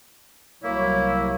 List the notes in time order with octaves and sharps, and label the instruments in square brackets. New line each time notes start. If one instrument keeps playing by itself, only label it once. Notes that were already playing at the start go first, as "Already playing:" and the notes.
[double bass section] C2 F#3 G3 [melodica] A#3 [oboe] E4 [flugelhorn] C#5